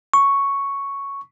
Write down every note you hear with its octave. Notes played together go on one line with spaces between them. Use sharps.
C#6